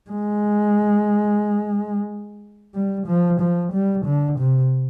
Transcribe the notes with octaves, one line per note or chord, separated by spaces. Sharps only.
G#3
G3
F3
F3
G3
D3
C3